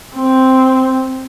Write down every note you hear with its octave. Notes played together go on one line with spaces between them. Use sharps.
C4